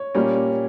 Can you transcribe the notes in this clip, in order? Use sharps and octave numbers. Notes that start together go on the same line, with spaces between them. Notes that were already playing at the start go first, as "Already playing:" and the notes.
Already playing: C#5
A#2 G3 A#3 C#4